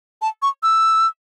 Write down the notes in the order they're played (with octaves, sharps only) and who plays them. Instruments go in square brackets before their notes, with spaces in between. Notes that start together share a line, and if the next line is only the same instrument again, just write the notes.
[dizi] A5
C#6
E6